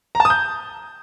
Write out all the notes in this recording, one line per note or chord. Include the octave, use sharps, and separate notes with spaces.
A#5
A5
D#6
G6